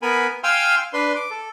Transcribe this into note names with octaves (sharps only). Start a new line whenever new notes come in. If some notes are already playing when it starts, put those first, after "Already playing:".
B3 A#4 G#5 B5
F5 G5 G#5 C6 E6 F6
D4 B4 C6
D6
A4